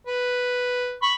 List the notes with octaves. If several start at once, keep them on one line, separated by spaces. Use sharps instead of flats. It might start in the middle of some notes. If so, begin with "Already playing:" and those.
B4
B5 C#6